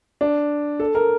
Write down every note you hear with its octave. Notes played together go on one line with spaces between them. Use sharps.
D4
A4
A#4